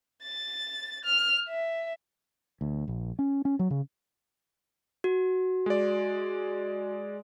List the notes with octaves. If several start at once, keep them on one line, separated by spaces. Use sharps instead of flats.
A6
F6
E5
D2
A#1
C#4
C#4
F#3
C#3
F#4
G#3 D5